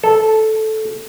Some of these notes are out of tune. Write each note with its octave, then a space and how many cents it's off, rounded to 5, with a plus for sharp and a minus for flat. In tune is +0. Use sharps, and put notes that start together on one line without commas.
A4 -10